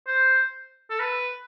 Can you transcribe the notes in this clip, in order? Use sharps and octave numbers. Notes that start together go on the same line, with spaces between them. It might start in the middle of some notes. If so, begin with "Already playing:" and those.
C5
A4
B4